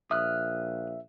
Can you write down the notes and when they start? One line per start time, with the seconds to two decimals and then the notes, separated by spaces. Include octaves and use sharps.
0.11 A#1 E5 D#6 F6 F#6